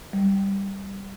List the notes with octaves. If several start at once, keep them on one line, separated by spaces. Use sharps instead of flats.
G3